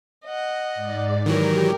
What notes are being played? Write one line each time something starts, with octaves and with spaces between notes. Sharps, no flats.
D#5 F#5
G#2 D5
D#3 E3 F#3 G4 A#4